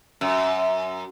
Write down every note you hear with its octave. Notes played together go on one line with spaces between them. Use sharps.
F#2